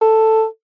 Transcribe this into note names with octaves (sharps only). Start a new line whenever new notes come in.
A4